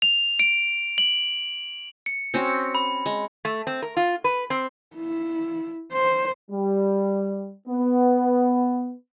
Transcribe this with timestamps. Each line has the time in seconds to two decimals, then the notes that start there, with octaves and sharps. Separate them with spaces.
0.02 F7
0.39 D7
0.98 F#7
2.06 C#7
2.34 C4 C#4 F#4
2.75 B5
3.06 G#3
3.45 A3
3.67 C4
3.82 A#4
3.97 F4
4.24 B4
4.50 C4
4.96 E4
5.92 C5
6.51 G3
7.68 B3